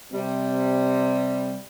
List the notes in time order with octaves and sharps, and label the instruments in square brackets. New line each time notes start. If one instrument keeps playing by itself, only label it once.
[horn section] C3 G3